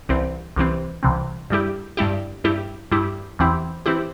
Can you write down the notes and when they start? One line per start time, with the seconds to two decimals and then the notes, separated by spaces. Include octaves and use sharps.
0.09 C2 C3 E3 C4
0.56 C2 C3 E3 C4
1.03 C2 C3 E3 C4
1.50 G2 G3 E4 G4
1.97 G2 G3 E4 G4
2.44 G2 G3 E4 G4
2.91 G2 G3 E4 G4
3.39 E2 E3 C4 E4 G4
3.86 E3 C4 E4 G4